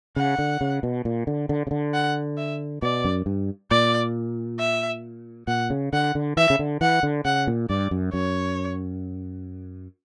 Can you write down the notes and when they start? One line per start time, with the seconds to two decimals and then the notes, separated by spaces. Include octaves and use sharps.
0.16 C#3 F#5
0.39 D3
0.61 C#3
0.83 B2
1.05 A#2
1.27 D3
1.49 D3
1.67 C#3
1.71 D3
1.94 F#5
2.37 E5
2.82 B2 D5
3.05 F#2
3.26 G2
3.70 A#2 D5
4.59 E5
5.47 A#2 F#5
5.70 C#3
5.93 D3 F#5
6.15 D3
6.37 E3 E5
6.50 C#3
6.59 D3
6.81 E3 F#5
7.03 D3
7.25 C#3 F#5
7.47 A#2
7.69 G2 D5
7.91 F#2
8.13 F#2 C#5